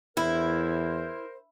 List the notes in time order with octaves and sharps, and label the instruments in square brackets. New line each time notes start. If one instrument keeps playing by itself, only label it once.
[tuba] E2 [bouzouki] E4 [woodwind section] A#4 C5